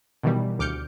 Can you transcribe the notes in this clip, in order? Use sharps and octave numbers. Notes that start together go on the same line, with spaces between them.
B2 D#3 E3 G3
D2 D6 F6 G6 C#7